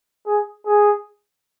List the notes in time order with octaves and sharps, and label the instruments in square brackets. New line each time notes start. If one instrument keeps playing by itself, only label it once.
[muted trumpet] G#4
G#4